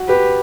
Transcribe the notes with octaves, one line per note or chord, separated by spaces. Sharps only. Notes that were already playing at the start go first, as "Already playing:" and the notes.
Already playing: F#4
G4 B4